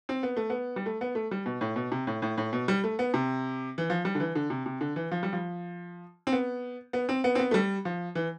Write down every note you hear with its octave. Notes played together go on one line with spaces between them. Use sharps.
C4
B3
A3
B3
G3
A3
B3
A3
G3
B2
A2
B2
C3
A2
A2
A2
B2
G3
A3
B3
C3
E3
F3
G3
D3
E3
D3
C3
C3
D3
E3
F3
G3
F3
C4
B3
B3
C4
B3
C4
B3
A3
G3
F3
E3